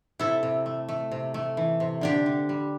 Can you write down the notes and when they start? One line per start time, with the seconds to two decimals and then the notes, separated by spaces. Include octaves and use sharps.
0.19 C3 E4 A4
0.43 C3
0.66 A3
0.88 A3
1.11 C3
1.34 A3
1.57 E3
1.80 C3
2.01 D3 D4 G4
2.26 D3
2.49 G3